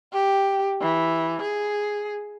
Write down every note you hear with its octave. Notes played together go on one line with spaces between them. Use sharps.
G4
E3
G#4